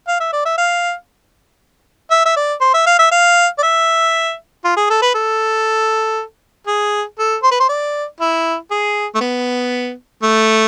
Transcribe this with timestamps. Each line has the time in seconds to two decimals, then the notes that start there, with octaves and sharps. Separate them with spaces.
0.08 F5
0.20 E5
0.33 D5
0.45 E5
0.58 F5
2.11 E5
2.25 E5
2.36 D5
2.61 C5
2.74 E5
2.86 F5
2.99 E5
3.11 F5
3.58 D5
3.63 E5
4.64 F4
4.76 G#4
4.90 A4
5.02 B4
5.14 A4
6.67 G#4
7.18 A4
7.43 C5
7.51 B4
7.60 C5
7.69 D5
8.20 E4
8.71 G#4
9.15 A3
9.21 B3
10.22 A3